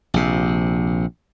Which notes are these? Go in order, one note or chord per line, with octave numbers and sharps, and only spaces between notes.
A#1 C3